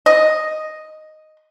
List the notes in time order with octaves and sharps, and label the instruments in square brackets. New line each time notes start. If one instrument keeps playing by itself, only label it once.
[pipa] D#5